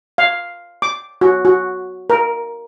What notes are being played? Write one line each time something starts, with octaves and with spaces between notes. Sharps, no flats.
F5
D6
F#4
F#4
A#4